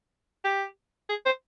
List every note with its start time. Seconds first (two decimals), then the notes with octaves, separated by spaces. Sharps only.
0.44 G4
1.09 G#4
1.26 C5